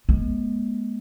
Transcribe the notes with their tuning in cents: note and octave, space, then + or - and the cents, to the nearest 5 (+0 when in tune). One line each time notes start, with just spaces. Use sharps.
G#3 +20 B3 -35